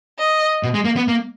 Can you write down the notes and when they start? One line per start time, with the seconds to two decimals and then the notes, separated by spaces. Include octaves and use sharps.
0.19 D#5
0.63 B2
0.74 G#3
0.85 A#3
0.96 B3
1.08 A#3